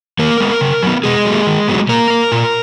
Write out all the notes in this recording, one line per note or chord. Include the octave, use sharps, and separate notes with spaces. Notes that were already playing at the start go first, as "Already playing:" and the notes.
D#3 A#3 A#4
G#3 B3
C#3
F#3 B3
B2 G#3 G#4
F#3
A#3
D#3
F#3 B3
A#2 A#3 A#4
A#3
A#2